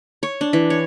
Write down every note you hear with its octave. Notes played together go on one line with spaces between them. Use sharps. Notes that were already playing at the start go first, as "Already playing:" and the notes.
C#5
D4
E3
C#5